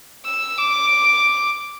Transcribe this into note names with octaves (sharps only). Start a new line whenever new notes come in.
E6
D6